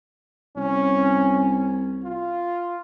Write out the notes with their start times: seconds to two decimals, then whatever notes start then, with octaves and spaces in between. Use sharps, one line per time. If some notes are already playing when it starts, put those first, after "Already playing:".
0.56 C2 C#4
2.04 F4